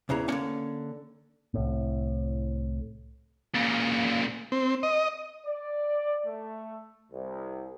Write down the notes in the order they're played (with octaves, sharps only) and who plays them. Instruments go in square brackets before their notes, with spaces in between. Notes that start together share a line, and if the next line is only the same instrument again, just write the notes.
[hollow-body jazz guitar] E2 C#3 E3 A#5
D3 A#3 C#4
[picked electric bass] C2 A2
[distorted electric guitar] A#2 C#3
[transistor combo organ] C4
D#5
[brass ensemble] D5
A3
C2